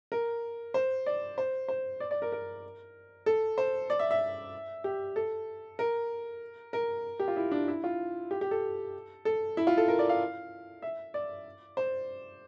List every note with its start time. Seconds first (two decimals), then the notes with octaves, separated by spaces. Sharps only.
0.12 A#4
0.74 C5
1.06 D5
1.38 C5
1.68 C5
2.00 D5
2.11 D5
2.22 A#4
2.32 A#4
3.26 A4
3.58 C5
3.90 D5
3.99 E5
4.11 E5
4.84 G4
5.16 A4
5.79 A#4
6.73 A#4
7.20 G4
7.28 F4
7.36 E4
7.52 D4
7.68 E4
7.84 F4
8.31 G4
8.41 G4
8.51 A4
9.25 A4
9.57 E4
9.67 F4
9.77 A4
9.88 A#4
9.99 D5
10.09 F5
10.82 E5
11.14 D5
11.77 C5